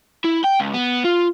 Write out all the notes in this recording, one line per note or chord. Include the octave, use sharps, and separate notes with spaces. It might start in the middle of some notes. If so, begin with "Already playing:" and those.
E4
G5
C#2
B3
F4